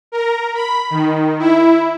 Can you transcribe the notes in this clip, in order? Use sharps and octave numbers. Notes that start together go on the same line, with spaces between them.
A#4
B5
D#3
E4